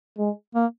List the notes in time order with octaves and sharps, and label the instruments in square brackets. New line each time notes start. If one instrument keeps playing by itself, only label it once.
[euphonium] G#3
[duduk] A#3